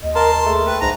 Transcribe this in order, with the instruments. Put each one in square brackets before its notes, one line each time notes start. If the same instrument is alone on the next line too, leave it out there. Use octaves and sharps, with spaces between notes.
[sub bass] D#2 [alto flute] D#5
[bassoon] A#4 [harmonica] A5 C6
[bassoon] A#4
[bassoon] A3 [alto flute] G#4
[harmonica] B4 [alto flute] G5
[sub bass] C2 [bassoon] G#2 [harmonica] A#5